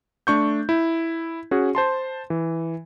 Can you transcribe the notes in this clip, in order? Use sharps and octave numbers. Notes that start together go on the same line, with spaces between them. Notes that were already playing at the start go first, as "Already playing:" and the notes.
A3 D4 C#6 G6
E4
C#4 F#4 G#4
C5 A5 C6
E3